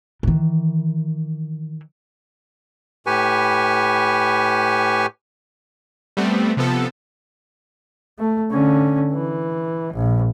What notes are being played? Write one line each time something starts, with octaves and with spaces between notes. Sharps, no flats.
D#3 E3
A2 G4 B4 G#5 C#6
G3 A3 B3 C4
C3 F3 B3 A4
A3
D3 C#4
E3
A#1